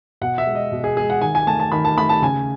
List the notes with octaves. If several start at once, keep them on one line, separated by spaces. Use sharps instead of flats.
B2 F#5
E5
G#3
D#5
B2
G#4
G#3 G#4
F#5
D#3 G#5
G#5
A3 A5
A5
D#3 B5
A5
A3 B5
A5
C#3 G#5